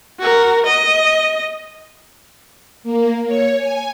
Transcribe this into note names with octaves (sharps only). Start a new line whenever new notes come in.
F#4 A#4
D#5
A#3
C#5
G#5